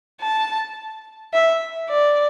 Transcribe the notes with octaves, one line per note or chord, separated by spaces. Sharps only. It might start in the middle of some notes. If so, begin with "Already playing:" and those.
A5
E5
D5